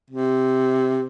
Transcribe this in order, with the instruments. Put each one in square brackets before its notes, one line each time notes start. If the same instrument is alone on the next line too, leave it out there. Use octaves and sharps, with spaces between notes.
[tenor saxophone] C3